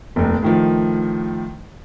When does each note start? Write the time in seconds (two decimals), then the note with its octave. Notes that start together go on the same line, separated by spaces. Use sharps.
0.16 F1 D#2
0.43 A2 D#3 F3